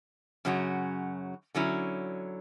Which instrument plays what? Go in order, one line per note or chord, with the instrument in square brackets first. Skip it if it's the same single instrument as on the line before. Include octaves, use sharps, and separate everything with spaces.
[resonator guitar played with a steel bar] F#2 C#3 F#3 C#4
D3 F#3 C#4 E4